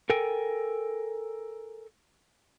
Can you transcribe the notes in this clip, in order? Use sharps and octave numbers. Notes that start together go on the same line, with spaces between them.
A4 A#4 G5 G#5